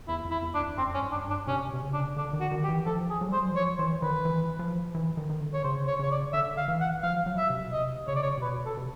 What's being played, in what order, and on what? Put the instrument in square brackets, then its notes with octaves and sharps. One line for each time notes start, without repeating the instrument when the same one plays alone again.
[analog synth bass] E2 [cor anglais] E4
[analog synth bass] F2
[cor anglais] E4
[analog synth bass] E2
[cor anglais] D4
[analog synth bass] F2
[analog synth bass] F#2 [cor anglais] C4
[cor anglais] C#4
[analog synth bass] G#2
[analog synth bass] G2 [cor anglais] D4
[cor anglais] D4
[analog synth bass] C3 [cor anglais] C#4
[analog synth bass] C3
C#3
[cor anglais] D4
[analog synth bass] D3 [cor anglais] D4
[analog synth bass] D#3
[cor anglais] F#4
[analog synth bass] D#3
[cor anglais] G4
[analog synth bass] E3
[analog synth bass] F3 [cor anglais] A4
[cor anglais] G#4
[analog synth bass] F#3
G3
[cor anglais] C5
[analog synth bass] F#3
E3
[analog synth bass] F3 [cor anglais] C#5
[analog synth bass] E3 [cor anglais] C5
[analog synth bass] D#3 [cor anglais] B4
[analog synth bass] E3
F3
E3
D#3
D#3
D3
[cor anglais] C#5
[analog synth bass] C#3 [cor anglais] C5
[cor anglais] C#5
[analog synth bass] C#3 [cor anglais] C#5
[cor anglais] D5
[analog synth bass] D3 [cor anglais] E5
[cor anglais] F5
[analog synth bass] E3
[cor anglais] F#5
[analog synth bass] F3 [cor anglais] F5
[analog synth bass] F#3
[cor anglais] E5
[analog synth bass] C3
B2
[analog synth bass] C3 [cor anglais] D#5
[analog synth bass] C#3 [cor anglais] C#5
[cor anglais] D5
C#5
[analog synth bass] C3
[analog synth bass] B2 [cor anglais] B4
[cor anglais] A4
[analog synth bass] C3